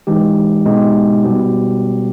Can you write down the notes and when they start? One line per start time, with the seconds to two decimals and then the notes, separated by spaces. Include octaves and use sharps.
0.07 E3 G#3 D#4 G4
0.65 B2 G#3 B3 D#4 G4
1.24 B2 G3 B3 G4